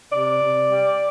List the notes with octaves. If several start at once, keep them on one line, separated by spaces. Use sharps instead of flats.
C3 D5
C3
G3